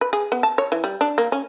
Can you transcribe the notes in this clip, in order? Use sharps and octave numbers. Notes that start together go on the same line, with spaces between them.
B4
G#4
B3
A5
C#5
E3
G3
D4
A#3
C#4